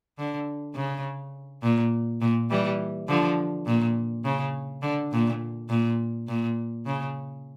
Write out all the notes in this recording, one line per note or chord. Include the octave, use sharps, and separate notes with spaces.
D3
C#3
A#2
A#2
E3 G3
D3 F3
A#2
C#3
D3
A#2
A#2
A#2
C#3